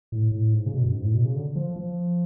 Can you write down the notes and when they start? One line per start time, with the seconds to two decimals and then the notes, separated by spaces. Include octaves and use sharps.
0.12 A2
0.32 A2
0.53 G#2
0.66 C#3
0.74 B2
0.84 F#2
0.94 G#2
1.04 A2
1.14 B2
1.25 C#3
1.35 D3
1.56 F3
1.76 F3